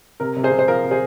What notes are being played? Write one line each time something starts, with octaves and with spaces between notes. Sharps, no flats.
C3 A#4
C3
G#4 C5
C3
C5
F3 A#4
C3
G#4 C5